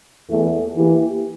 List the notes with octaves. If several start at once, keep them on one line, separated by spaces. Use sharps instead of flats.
E2 E3 A3
E3 A#3 E4 G4